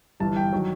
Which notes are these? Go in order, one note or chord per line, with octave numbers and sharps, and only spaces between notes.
G1 G2 E3 A5
G5
D#3 F#3